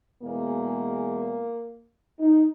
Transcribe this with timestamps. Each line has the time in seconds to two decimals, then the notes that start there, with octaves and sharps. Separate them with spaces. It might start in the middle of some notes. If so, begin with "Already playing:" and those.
0.22 E2 B2 G#3 A#3
2.19 D#4